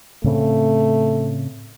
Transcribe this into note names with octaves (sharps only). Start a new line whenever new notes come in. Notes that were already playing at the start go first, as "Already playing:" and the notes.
A2 C#3 A3 C4